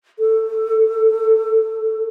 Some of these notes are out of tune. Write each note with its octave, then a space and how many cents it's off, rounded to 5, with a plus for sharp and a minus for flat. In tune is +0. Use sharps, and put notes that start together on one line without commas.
A4 +15